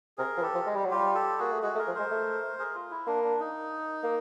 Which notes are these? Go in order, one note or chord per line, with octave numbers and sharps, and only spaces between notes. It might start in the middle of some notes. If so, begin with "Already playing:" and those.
C3 G#4 A#4
F3
E3 G4 A4
F3
G#3
G3
F#3
G3 F4 G4
G4 A4
A#3 F#4 G#4
A3
G#3 F#4 G#4
A3
G#4 A#4
F3
G#3 A#4 C5
A3
G#4 A#4
F4
E4
A#3 D4
D4
D#4
A#3